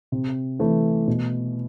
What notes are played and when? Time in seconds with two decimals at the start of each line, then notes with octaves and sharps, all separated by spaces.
0.12 C3
0.59 E3 A3
1.07 B2